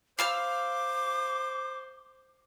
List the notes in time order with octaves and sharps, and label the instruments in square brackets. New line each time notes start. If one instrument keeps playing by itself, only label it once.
[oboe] C5 [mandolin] F5 E6 F6 [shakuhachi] D6